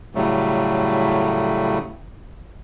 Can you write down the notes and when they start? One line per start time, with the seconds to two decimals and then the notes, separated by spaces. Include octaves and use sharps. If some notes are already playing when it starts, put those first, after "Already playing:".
0.15 A2 C#3 F#3 G3 A3